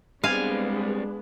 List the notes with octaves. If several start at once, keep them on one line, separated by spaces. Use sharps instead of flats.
G3 G#3 B3 C4 D4 F5 G#5